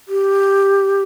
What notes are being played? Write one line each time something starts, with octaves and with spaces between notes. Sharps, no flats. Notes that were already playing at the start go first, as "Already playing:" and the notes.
G4